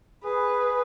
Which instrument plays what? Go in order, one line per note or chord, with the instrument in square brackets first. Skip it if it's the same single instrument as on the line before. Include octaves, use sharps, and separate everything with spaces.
[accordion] G#4 [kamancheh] B4